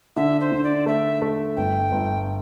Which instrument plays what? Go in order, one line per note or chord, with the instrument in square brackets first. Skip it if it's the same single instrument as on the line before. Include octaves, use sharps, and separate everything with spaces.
[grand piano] D3 [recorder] E5
[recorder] C5
[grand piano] D3
[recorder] D5
[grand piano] A3 [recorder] E5
[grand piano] A3
[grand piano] G1 [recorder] G5
[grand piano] G1